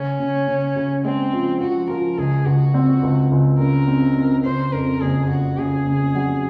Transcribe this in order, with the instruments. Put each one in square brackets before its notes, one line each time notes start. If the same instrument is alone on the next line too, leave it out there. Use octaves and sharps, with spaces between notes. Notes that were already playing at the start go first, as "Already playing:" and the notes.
Already playing: [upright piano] C#3 [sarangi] C#4
[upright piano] C#3
C#3
C#3
[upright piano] G#3 [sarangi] C4
[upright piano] F3
[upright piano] F3 [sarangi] F#4
[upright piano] F3 [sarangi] A#4
[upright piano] C#2 [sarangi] G#4
[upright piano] C#2 [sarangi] F#4
[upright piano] C4
C#2
C#2
[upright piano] C#3 [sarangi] A#4
[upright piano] C4
C4
[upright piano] C#3 [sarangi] C5
[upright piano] F2 [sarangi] A#4
[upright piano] F#1 [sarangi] G#4
[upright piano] C#3 [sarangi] F#4
[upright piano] C#3 [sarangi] G#4
[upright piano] C#3
F#3